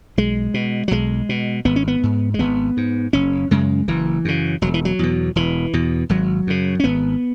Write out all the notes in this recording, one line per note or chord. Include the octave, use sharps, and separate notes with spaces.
B1 G#3
B2
F#3
B1 G#3
B2
G#1 B3
C#4
B3
G#2
G#3
G#1 B3
G#2
F#1 C#4
F#2 C#3 G#3
F#1 E3
F#2 C#3
E1 F#3
E3
F#3
E2 B2
E1 E3
E2 B2
G#1 F#3
F#2 C#3
C#4
G#1 B3